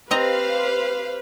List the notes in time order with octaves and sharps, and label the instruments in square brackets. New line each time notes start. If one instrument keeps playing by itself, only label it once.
[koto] C4 D#5 A#5 [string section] G4 C5 F5 [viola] B4